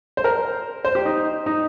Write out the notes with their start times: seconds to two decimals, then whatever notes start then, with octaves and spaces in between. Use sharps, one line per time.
0.17 C5
0.24 A#4
0.85 C5
0.95 G4
1.05 D#4
1.46 D#4